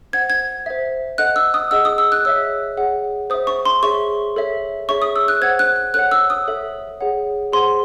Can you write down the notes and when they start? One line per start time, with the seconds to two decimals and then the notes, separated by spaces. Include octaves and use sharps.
0.13 C5 F#5 G#6
0.30 G#6
0.66 C5 E5
1.18 A4 D#5 F#5 F#6
1.36 E6
1.54 D#6
1.71 G#4 D#5 F#5 E6
1.85 D#6
1.98 E6
2.12 F#6
2.25 G#4 C#5 E5 E6
2.77 G#4 C#5 F#5
3.30 C5 E5 D#6
3.47 C#6
3.66 C6
3.82 G#4 C#5 E5 C#6
4.36 A4 C#5 E5
4.89 G#4 C#5 E5 C#6
5.02 D#6
5.16 E6
5.28 F#6
5.41 C5 F#5 G#6
5.59 F#6
5.76 F#6
5.94 A4 C#5 F#5 F#6
6.11 E6
6.30 D#6
6.47 A4 C#5 E5
7.01 G#4 C#5 F#5
7.53 G#4 C5 F#5 C6